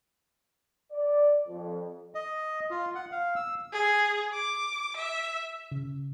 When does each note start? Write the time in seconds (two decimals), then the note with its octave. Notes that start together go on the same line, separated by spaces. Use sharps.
0.92 D5
1.48 F2
2.15 D#5
2.70 F4
2.95 F#5
3.12 F5
3.36 E6
3.73 G#4
4.33 D6
4.97 E5
5.72 C#3